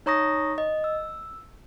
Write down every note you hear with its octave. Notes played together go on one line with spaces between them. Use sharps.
D#4 C#5 A#5 C#6 D#6 A#6
D#5
E6